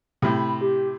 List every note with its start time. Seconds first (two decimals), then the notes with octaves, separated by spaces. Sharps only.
0.22 A2 C3 B5
0.61 G4